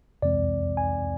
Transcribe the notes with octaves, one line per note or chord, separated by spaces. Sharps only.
F2 C3 E3 G#3 C4 D5
G#5